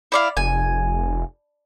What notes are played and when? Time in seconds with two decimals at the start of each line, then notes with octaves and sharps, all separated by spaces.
0.12 E4 D5 F5
0.37 F1 G#5